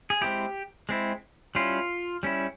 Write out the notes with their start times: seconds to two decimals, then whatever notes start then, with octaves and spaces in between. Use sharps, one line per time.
0.10 G#4
0.21 G#3 C4 E4 G4
0.89 G#3 C4 E4
1.55 G3 C#4 E4 F4
2.23 G3 C#4 E4